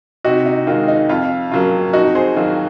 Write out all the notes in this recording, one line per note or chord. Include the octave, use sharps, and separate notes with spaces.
C3 D#4 F#4
D#4
D#3 G#3 F4
D#4
F2 F4
C#3 F#3 A#3 F4
F2 D#4 F#4
G#4 C5
D#3 F#3 A#3 F4